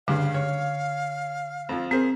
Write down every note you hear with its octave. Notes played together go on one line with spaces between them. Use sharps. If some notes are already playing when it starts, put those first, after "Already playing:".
C#2 G2 D3 F5
C#5
F2 F3
C4 G#4 A#4 C5